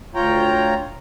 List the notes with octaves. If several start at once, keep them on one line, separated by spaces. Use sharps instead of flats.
D2 F4 C#5 G5 A#5